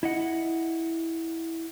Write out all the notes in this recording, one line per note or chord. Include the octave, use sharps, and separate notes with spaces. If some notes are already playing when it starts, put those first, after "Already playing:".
E4 D#5 F#5